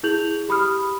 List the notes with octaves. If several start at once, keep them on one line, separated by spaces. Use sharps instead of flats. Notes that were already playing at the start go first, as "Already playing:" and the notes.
E4 G#4 G6 F7 F#7
G4 B5 D#6 F6